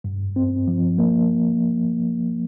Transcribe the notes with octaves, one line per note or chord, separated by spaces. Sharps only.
G2
C4
F3
A#3